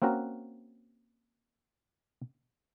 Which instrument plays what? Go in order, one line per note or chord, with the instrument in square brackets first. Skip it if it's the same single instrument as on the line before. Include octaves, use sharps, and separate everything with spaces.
[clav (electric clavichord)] A#3 C4 C#4 F#4 A#4